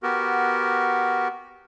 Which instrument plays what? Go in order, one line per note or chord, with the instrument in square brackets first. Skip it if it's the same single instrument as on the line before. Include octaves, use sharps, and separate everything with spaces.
[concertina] B3 F#4 G4 A#4